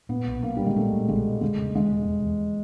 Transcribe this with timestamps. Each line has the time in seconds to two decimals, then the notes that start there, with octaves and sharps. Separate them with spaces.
0.09 A#2 B3
0.26 B1
0.42 F#3 A#3
0.57 A#2 G3
0.66 G#3
0.76 A#2 A3
0.93 A#2
1.08 B1 G#3
1.25 A#2
1.41 E1 G#3
1.58 C#3
1.75 E2 G#3
1.92 E1
2.08 E1
2.24 E2